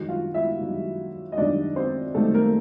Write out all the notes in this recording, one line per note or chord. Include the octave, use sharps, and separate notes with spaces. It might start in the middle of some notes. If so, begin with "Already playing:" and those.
Already playing: F#2 D#3 G3 F#4
F4 F5
E4 E5
F#2 D#3 G3
D#5
F#2 D#3 G3 D4 D5
C4 C5
F#2 D#3 G3 A3 A4
A#3 A#4